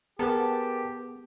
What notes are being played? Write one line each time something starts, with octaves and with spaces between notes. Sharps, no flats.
B3 G4 G#4 A#4 B4 A5